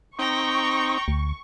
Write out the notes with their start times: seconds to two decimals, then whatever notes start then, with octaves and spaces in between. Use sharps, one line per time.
0.19 C4 D#4 G5 A#5 C#6
1.08 D2